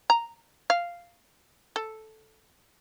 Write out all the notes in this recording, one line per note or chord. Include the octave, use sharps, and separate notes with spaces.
A#5
F5
A4